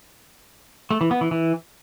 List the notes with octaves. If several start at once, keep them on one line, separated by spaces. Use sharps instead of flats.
A3
E3
B3
E3
E3